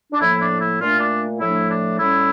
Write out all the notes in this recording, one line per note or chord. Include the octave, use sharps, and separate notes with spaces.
D4
A2 F3 A#3 E4
D4
E4
A#2 A3 D4 F4
D4
A2 F3 A3 D4 E4
D4
A2 G3 C#4 E4